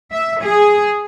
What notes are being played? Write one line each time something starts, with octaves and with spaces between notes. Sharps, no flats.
E5
G#4